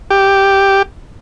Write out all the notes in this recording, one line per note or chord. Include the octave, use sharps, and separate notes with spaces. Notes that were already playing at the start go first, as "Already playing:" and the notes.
G4